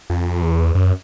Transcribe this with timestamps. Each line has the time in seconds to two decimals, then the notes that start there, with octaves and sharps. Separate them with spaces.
0.10 F2
0.42 E2
0.75 F#2